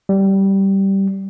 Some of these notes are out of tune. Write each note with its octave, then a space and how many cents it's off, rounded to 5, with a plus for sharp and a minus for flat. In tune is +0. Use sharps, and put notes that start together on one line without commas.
G3 -10